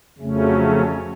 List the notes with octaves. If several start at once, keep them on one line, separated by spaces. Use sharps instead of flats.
F2 C#3 F#3 A3 C#4